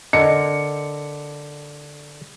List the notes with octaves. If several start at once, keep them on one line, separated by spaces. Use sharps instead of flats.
D3 A#4 D#5 C#7